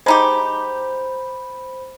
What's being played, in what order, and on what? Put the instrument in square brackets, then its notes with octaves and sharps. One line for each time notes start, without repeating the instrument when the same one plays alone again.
[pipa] G#3 D#4 G4 [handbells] C5 B5